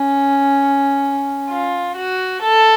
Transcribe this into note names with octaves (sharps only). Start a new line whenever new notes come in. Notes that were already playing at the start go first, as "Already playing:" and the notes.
Already playing: C#4
F4
F#4
A4